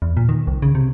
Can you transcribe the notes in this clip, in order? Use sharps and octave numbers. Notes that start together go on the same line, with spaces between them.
E2
A#2
D#3
C2
C#3
C3